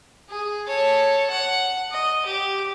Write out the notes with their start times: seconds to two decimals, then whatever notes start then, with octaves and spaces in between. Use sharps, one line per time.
0.29 G#4
0.67 A4 C#5
1.31 F#5
1.92 D#5
2.26 G4